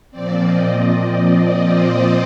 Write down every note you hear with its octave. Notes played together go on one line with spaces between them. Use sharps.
A#2 F3 C4 D5
D#5
D#5
D5
C5